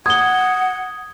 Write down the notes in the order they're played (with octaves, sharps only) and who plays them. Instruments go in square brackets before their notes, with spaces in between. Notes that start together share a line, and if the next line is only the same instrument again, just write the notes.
[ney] F#5 [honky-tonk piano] D#6 [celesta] G#6 G7